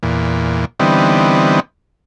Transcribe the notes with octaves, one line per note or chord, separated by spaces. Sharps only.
E2 A#2
D3 E3 G3 B3 C4 D#4